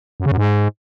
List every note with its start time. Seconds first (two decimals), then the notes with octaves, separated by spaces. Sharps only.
0.20 F#2
0.26 C#3
0.32 F#2
0.38 G#2